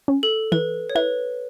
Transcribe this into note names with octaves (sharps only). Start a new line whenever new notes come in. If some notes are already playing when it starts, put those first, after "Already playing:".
C#4
A4
E3 B4
C#5
E4 B4